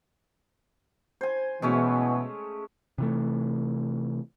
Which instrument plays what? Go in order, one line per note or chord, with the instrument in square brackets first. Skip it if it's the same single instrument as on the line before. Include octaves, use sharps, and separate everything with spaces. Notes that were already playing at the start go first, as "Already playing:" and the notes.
[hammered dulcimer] C5 G#5
[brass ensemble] B2 E3 [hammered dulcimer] G#3 A3 C#4
[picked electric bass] C3 E3 A3